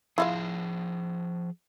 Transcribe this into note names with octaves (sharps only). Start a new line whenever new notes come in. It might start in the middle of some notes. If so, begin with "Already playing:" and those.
F3 E4 F4 G#4 F5